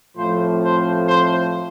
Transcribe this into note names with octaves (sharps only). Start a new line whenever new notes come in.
A2 F3 A3 C4 C5
C5
C5